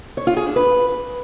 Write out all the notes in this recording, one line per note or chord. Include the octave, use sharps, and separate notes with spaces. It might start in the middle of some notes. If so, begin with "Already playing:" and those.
C#5
F4
G#4
D4
B4